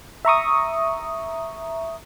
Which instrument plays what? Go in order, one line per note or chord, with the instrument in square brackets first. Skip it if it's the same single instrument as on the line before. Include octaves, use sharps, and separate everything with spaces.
[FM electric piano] E5 A#5 C#6 D#6